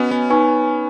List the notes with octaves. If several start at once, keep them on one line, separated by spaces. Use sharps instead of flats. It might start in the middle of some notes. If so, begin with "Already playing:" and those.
Already playing: B3 C#4 F#4 D#5 G#5
B3
D#4 B4 G#5 C#6